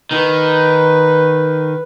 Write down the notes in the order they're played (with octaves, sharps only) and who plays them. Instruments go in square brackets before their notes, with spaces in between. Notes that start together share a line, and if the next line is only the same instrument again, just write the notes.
[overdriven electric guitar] D#3 [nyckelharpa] B4